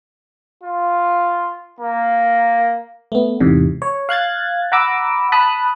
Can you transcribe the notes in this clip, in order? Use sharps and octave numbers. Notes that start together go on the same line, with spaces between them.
F4
A#3
A3 B3
E2 G#2 C3
C#5
F5 F#6 G#6 A6
F#5 A#5 B5 D6 E6
A5 B5 D#6 F#6